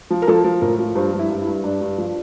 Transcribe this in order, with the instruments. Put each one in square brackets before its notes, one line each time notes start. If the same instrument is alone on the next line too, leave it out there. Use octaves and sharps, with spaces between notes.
[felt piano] F3
A#4
F3 A4
F3
A2 A#4
F3
G2 C5
G2
E4
G2
E4
G2
G2 D4
G2
F3